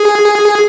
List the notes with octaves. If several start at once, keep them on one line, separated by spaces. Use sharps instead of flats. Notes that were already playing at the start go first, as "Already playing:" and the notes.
Already playing: G#4